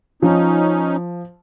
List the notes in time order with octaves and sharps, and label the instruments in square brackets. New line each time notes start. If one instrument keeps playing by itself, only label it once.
[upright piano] F3 [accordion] C#4 D#4